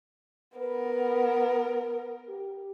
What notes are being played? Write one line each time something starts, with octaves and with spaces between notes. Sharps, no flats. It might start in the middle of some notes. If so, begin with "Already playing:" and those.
B3 A#4 B4
G4